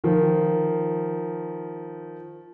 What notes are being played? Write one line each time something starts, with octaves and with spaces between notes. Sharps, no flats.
D#3 F3